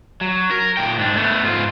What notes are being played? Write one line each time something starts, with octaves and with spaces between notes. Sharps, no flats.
F#3
A#4
A#2 G5
G#2 D4
A3 B3
G#2 F4